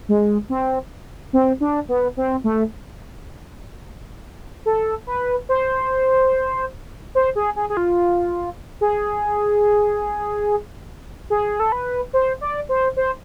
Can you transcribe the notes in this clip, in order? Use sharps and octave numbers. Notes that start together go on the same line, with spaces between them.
G#3
C4
C4
D4
B3
C4
A3
A4
B4
C5
C5
G#4
G#4
G#4
F4
G#4
G#4
A4
B4
C5
D5
C5
C5